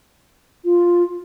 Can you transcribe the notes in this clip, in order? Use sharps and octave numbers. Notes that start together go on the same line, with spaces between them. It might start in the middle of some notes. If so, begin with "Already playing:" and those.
F4